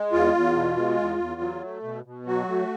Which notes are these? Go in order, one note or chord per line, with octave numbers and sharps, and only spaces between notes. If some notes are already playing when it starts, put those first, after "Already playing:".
Already playing: G#3
E2 F4
E2
B2
G#3
E2
E2
F#3
A3
B2
B2
F#3 F#4
A3